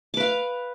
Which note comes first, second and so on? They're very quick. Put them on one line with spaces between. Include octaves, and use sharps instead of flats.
D6 B4 F5